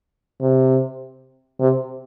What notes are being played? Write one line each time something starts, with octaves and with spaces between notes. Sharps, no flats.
C3
C3